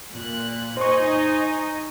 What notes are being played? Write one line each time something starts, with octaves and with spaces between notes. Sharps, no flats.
A#2 F#6
D#4 C5 D#5 G#5 C#6